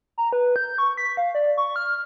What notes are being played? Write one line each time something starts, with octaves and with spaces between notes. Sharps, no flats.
A#5
B4
G6
C#6
B6
F5
D5
C#6
F6